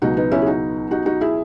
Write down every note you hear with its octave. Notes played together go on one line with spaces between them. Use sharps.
C#2 B2 F#3 D#4 F#4
B3 D#4
C#4 E4
G#4
D#4 F#4
D#4 F#4
D#4 F#4
E4 G#4